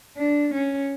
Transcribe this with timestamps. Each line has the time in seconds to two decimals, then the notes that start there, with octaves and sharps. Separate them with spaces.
0.17 D4
0.54 C#4